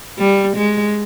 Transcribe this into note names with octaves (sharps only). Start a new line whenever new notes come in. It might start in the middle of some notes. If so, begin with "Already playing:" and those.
G3
G#3